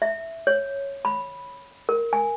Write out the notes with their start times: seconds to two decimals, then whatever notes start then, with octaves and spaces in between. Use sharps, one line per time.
0.02 E5
0.47 C#5
1.05 B5
1.89 A#4
2.13 G#5